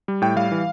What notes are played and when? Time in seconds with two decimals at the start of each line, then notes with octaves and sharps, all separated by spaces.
0.08 G3
0.22 A2 G5
0.36 G3 F5
0.52 E3